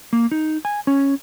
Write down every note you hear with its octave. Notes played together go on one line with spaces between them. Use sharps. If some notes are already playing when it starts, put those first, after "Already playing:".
A#3
D#4
G#5
C#4